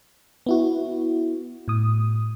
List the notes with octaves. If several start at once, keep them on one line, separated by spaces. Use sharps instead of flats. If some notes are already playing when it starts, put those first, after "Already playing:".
B3 E4 F#4
A2 D#6